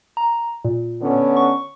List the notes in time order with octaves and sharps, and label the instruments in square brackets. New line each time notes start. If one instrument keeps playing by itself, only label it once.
[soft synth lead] A#5
A#2
[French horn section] D3 B3 C#4
[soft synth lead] C#6